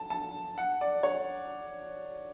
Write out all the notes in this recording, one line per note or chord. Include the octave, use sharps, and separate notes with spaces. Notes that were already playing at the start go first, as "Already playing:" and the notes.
Already playing: A5
A5
F#5
D5
C#5